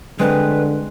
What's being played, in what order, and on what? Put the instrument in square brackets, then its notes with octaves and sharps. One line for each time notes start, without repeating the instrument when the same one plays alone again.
[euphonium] D3 [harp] G#3 C4 [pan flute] B4